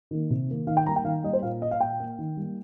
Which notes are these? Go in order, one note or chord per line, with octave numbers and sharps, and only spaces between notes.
D#3 A#3
C3
D#3 A#3
D#3 F5
G5
G3 A#3 A#5
G5
D#3 F5
G3 A#3 D#5
C5
A#2 F5
A#3 D#5
F5
A#2 G5
A#3
D#3
G3 A#3